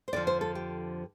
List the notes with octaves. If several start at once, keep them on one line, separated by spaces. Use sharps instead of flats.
C5
F2 D3 F3 D5
C5
A4
G4